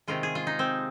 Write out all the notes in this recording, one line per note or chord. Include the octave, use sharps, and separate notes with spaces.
C3 D#3 G#3 F4
G#4
F4
D#4
C4